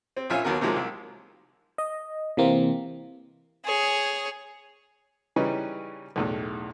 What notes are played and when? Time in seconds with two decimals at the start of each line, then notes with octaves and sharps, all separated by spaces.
0.17 C4
0.30 A#1 C#4 F4 E5 G#5
0.44 D#2 F#3 B3 A#4
0.61 C3 D#3 F3 F#3 G#3 A#3
0.76 C2
1.78 D#5
2.37 C3 E3 A#3 C4
3.65 G#4 C#5
5.36 C#3 E3 G3 C#4 D#4 B4
6.16 B1 E2 A2